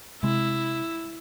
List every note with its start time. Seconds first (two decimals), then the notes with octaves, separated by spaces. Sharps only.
0.23 C3 G#3 E4